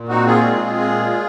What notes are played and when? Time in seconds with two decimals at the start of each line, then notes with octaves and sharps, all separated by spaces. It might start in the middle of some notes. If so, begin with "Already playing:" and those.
Already playing: A#2
0.08 C4 D#4 F#4
0.26 F4 G#4
0.44 G#3
0.80 A#2